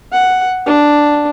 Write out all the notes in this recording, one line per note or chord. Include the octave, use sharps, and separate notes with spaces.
F#5
D4